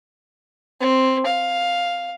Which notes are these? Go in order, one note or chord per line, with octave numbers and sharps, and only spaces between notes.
C4
F5